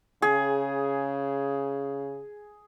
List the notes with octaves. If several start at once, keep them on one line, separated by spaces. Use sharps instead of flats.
C#3 G#4